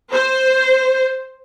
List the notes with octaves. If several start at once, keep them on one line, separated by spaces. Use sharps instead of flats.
C5